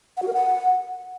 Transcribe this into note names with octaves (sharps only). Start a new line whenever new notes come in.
F#5
F#4
A#4
F#5